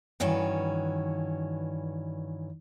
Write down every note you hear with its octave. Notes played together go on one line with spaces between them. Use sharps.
G2 D#3 E3 C#4 F#4